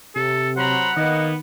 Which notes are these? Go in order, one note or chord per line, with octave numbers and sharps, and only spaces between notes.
C3 A4
F#3 C5 F#5 A#5 B5
D#3 A#3 B3 D#5